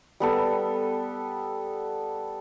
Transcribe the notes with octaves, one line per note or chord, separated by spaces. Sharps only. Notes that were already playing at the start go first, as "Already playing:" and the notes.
G3 B3 A4